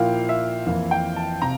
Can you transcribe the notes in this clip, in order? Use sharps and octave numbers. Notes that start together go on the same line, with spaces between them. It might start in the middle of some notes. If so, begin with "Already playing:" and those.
Already playing: A#2 F3 A#3 E4 F5 G5
E5
F2 E3 A#3 E4 F5
G5
A5
C3 A#5